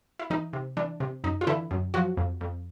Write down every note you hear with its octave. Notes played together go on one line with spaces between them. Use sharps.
E4
E3 D#4
C3
E3 D4
C3
F#2 D#4
F4
D3 E3 E4
F#2
F3 F#3 F#4
F2
F2